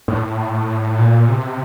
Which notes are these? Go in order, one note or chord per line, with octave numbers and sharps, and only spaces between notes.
A2
A#2
C3